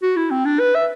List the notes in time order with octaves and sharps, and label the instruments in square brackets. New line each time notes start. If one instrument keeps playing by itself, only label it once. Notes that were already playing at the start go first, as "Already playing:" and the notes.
[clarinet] F#4
E4
C4
D4
B4
E5